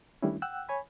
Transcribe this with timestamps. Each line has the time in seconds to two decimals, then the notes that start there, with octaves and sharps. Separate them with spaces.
0.22 D#3 G3 A3 C#4 D4 E4
0.42 F#5 G5 E6 F#6
0.69 C#5 G#5 B5